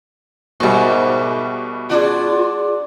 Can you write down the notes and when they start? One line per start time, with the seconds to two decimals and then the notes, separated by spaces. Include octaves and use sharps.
0.60 G#2 B2 G3 A#4 E5
1.90 D4 F4 F#4 G#4 D5